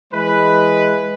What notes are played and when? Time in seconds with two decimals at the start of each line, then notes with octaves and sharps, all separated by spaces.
0.12 E3 G#3 B4